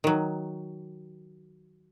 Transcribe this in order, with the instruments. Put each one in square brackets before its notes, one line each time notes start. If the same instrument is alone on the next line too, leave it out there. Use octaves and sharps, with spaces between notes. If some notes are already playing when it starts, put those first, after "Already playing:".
[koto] D#3 F#3